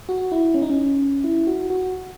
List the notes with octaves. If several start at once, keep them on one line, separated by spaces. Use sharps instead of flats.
F#4
E4
C#4
D#4
C#4
E4
F#4
F#4